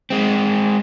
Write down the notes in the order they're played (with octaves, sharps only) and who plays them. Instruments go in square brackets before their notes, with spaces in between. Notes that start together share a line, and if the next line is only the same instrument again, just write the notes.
[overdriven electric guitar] G#3 C4